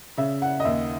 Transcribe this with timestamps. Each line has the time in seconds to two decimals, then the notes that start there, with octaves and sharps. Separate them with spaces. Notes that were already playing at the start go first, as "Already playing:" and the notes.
0.17 C#3 E5
0.42 F#5
0.60 D#5
0.65 D#2 E5